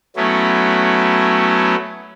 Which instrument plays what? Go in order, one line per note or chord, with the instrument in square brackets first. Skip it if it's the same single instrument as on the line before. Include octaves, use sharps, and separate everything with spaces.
[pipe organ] F#3 A3 B3 C#4 E4